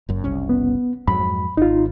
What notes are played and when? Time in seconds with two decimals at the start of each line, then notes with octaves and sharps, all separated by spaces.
0.09 F#1 F#2
0.24 F#1 C2 C#4
0.49 B3
1.08 F2 G#2 F#3 B5
1.57 G#1 D#4 F4